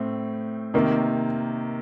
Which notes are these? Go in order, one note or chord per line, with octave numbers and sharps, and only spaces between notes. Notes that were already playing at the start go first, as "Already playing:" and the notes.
Already playing: A2 A3 C4
C3 D#3 A#3